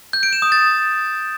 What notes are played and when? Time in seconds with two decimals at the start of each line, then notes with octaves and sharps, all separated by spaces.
0.13 G6
0.23 D7
0.33 E7
0.42 D#6
0.52 A6